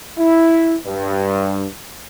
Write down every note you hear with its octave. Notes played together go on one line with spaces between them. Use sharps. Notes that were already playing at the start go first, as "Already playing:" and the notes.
E4
G2